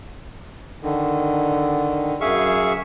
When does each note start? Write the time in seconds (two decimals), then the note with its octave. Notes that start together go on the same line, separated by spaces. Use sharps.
0.83 D3 D#3
2.21 F#2 G#4 E5 F5 C#6